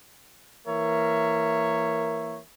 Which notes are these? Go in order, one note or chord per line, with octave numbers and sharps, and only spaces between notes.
E3 A#3 A#4 C#5 E5